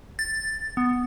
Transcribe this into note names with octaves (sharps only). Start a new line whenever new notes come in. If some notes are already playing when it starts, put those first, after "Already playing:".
A6
B3